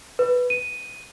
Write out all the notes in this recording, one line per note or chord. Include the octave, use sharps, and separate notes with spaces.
B4
D#7